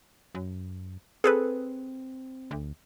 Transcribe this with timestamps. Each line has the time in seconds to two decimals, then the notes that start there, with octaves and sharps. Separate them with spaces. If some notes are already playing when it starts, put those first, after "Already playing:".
0.35 F#2
1.24 C4 G#4 A4 B4
2.51 D2